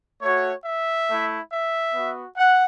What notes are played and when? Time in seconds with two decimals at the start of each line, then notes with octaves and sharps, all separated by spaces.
0.22 A3 F#4 C#5
0.65 E5
1.09 A3 E4
1.51 E5
1.95 B3 F#4
2.37 F#5